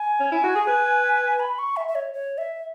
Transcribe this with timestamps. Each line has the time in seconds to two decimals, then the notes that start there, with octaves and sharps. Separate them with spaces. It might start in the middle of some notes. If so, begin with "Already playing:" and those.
Already playing: G#5
0.20 C#4
0.32 E4
0.44 F#4
0.55 G#4
0.67 B4
1.40 B5
1.59 C#6
1.77 E5
1.88 E5
1.95 C#5
2.14 C#5
2.38 E5